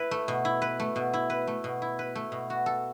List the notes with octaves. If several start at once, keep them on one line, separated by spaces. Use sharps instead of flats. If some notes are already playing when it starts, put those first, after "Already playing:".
Already playing: E4 B4
A3
B2
E4
B4
A3
B2
E4
B4
A3
B2
E4
B4
A3
B2
F#4
A4